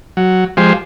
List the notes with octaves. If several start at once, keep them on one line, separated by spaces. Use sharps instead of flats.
F#3
F3 G#3 G4 C5